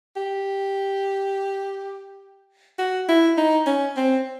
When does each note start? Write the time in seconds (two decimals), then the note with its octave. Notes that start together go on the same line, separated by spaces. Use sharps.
0.16 G4
2.79 F#4
3.09 E4
3.37 D#4
3.66 C#4
3.97 C4